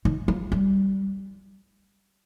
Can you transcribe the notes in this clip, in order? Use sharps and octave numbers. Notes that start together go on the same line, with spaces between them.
D#3
F3
G3